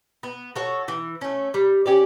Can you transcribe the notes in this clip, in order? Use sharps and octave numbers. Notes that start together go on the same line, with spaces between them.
B3
F#4 A4 C#5
E3
A3 C#4
G3
C#4 G4 D5